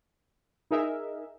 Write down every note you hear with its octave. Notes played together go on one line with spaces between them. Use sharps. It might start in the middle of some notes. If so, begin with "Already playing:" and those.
D#4 G#4 A#4 E5